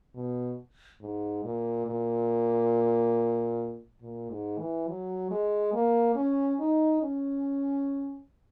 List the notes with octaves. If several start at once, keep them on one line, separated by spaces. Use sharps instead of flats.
B2
G#2
A#2
A#2
A#2
G#2
E3
F#3
G#3
A#3
C#4
D#4
C#4